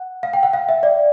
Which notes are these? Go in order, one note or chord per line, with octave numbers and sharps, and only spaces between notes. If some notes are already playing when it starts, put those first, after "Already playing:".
Already playing: F#5
F5
G5
F#5
F5
E5
D5